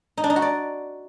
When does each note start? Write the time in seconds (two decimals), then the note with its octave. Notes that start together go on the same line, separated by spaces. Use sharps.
0.17 D#4
0.24 D4
0.30 D#4
0.36 F#4
0.42 D5